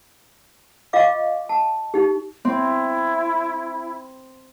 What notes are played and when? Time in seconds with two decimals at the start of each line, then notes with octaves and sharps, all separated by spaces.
0.93 F4 D#5 F5 C#6 D6
1.49 A5
1.94 D#4 G4
2.45 C4 E4